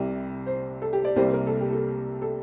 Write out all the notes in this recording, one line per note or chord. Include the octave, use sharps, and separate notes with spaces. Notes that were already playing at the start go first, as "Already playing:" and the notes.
Already playing: C2 C3 G3
C5
A4
G4
D5
C2 C3 G3 A#3 C5
A#4
A4
G4
A4
A4